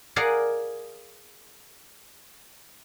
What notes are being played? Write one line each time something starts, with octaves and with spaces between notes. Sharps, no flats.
G#4 A#4 D5 D#5 F5 F#5